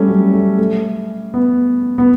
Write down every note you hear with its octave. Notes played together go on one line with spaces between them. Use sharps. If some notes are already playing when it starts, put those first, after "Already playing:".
Already playing: G3 A3 C#4
F#3
A3
A3
B3
B3